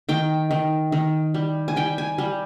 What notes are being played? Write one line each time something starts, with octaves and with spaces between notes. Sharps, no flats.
D#3 G5
D#3
D#3
G3
G#5
G3 G5
G#5
G3